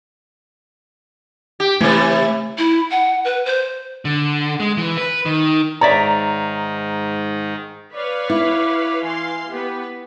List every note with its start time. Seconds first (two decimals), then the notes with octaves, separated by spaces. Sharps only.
1.60 G4
1.81 C3 E3 A3
2.58 E4
2.91 F#5
3.24 B4
3.46 C5
4.05 D3
4.60 G#3
4.77 E3
4.98 B4
5.26 D#3
5.81 G#2 D#3 C#5 D5 E5 A#5
7.94 B4 C#5 D5 F5
8.30 E4 D6
9.04 E3 F5 G#5 C6
9.49 B3 G4 B4